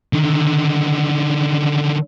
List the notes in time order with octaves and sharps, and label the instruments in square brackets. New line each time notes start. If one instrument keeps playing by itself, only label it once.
[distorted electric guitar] D3 D#3